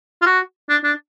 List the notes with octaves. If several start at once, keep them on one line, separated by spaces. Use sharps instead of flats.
F4
F#4
D4
D4